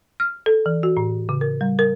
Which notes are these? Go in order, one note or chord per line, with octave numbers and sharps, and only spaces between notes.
F6
A4
E3
F#4
A2
C#3
A#4
G3
A#4